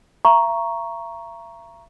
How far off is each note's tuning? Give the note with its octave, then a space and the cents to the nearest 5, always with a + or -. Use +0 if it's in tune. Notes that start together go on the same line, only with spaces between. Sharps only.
E5 +45 A#5 +10 C#6 +0